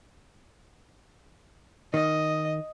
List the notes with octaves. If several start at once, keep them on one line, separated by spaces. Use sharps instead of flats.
D#3 D#5